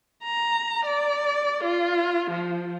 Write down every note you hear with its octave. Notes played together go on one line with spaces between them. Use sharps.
A#5
D5
F4
F3